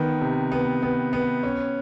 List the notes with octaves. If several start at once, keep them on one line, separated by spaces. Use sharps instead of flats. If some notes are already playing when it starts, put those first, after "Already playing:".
Already playing: D#3 B3
C3
B3
B3
B3
C#4